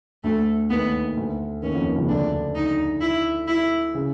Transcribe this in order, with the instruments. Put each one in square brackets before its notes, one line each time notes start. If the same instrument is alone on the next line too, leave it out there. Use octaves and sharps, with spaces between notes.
[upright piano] D2 D3 [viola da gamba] A3
[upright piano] D#2 D#3 [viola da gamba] B3
[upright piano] D2 D3
[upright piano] D#2 D#3 [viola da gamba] C#4
[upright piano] F2 F3
D#2 D#3
C#2 C#3
[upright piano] D2 D3 [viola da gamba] D4
[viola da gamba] D#4
E4
E4
[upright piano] C#3